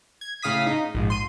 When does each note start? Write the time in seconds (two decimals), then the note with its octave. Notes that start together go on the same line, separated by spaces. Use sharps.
0.21 G#6
0.42 A2 C#3 F5 D#6 B6
0.67 D#4
0.95 A#1 G#2
1.10 C6 D#7